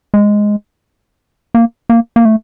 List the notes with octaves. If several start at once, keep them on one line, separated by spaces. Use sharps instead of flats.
G#3
A#3
A#3
A#3
A3